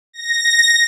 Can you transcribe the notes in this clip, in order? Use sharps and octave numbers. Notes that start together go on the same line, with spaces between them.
A#6